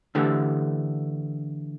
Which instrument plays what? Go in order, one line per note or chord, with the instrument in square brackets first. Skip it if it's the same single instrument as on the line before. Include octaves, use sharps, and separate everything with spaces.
[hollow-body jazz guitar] D3 E3 A3 G4